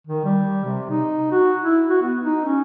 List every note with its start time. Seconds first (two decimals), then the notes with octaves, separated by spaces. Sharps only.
0.07 D#3
0.25 G3
0.65 C3
0.90 D#4
1.32 F#4
1.62 E4
1.89 F#4
2.02 B3
2.21 D#4
2.45 C#4